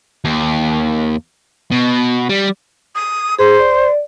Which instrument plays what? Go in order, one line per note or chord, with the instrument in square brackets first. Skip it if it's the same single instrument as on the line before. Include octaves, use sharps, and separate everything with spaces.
[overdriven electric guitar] D#2
B2
G3
[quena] D#6
[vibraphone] G#4 [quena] C5
[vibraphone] D5